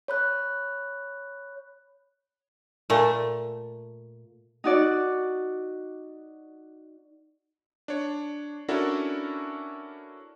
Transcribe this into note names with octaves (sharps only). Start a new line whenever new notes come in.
C#5 B5 F#6
A#2 A3
D#4 F#4 D5
D4 C#5
C#4 D4 E4 F#4 A4 A#4